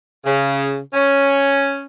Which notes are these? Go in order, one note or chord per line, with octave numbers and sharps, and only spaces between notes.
C#3
C#4